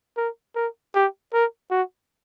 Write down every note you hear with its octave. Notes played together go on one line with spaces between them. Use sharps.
A#4
A#4
G4
A#4
F#4